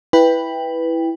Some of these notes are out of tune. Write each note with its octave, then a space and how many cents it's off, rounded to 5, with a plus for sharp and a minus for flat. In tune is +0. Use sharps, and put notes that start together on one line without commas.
E4 +0 B4 +0 G5 +15